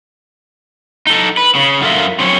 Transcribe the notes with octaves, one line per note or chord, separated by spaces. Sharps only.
D#4 A4
B4
C#3
F#2 D3 F4 A#4 E5
F#3 C4 C#4 C5 C#5